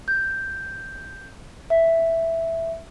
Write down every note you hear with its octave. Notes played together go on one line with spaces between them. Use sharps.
G6
E5